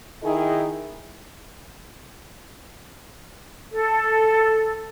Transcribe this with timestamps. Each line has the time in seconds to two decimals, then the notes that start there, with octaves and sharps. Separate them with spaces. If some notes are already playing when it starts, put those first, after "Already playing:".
0.24 D#3 D#4 E4 G#4 D#5
3.71 A4